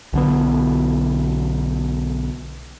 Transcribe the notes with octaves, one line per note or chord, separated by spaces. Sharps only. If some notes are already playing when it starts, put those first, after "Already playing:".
B1 D3 B3